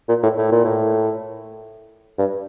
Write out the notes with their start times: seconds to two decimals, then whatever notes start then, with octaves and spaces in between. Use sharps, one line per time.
0.09 A#2
0.23 A2
0.38 A2
0.52 A#2
0.65 A2
2.18 G2